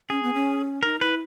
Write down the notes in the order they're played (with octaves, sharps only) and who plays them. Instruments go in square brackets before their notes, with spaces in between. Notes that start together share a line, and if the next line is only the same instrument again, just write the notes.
[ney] C#4 [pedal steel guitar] G#4
[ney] B3
C#4
[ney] D#4 [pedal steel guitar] A#4
[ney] E4 [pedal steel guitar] B4